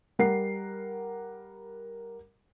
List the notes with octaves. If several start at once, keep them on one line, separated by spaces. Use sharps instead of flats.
G3 A#4 F#5 C7